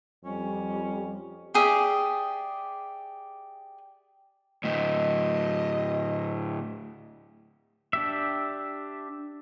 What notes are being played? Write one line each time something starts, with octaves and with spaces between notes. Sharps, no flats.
F2 G3 C#4
G4 G#4 D5 E5
D2 A2 D#5
D4 G4 E5